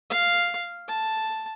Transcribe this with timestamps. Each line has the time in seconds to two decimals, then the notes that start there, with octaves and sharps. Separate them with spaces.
0.10 F5
0.88 A5